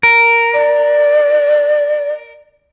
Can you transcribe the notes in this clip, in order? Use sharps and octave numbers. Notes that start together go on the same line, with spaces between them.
A#4
D5